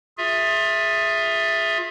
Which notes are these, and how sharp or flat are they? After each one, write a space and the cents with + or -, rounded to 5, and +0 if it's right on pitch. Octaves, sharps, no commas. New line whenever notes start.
F4 +25 G#4 +0 E5 +0